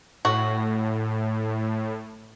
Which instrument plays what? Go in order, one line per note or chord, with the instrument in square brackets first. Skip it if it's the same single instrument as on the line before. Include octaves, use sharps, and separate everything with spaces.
[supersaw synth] A2 [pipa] F#4